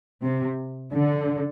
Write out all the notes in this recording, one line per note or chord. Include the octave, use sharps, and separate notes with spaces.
C3
D3